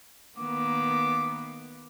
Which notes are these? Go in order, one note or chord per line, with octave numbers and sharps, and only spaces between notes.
D#3 A#3 B3 D6